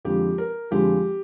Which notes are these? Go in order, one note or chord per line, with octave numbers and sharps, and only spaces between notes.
F2 D3 F3 G#3 G4
A#4
F2 D3 F3 G#3 G4